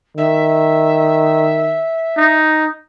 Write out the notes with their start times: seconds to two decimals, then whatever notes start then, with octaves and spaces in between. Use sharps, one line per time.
0.17 D#3 E5
2.18 D#4